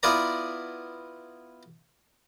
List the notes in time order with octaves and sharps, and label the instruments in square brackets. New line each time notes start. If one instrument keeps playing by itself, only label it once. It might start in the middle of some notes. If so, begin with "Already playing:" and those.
[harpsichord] B3 E4 F4 B4 D5 A#5